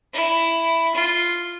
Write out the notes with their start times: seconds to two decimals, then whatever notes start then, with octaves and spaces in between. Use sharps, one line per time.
0.13 E4
0.94 F4